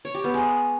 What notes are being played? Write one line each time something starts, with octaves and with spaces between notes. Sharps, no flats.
C#5
G4
B3
G#3